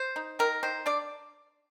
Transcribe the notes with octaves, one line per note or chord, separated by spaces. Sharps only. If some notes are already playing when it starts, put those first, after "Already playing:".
Already playing: C5
D#4
D#3 A#4
D#3 C5
D4 D5